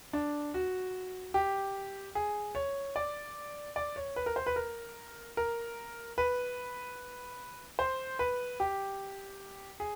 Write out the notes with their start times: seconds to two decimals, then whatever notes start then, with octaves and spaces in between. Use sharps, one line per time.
0.13 D4
0.54 F#4
1.34 G4
2.15 G#4
2.55 C#5
2.96 D5
3.76 D5
3.96 C#5
4.16 B4
4.26 A#4
4.36 C5
4.46 B4
4.56 A#4
5.37 A#4
6.18 B4
7.79 C5
8.19 B4
8.60 G4
9.80 G#4